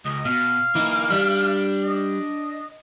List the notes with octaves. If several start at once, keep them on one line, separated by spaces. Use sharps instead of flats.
C#2 D#5
B2 F5
E3 A#3 D#4
G3 D4
D#5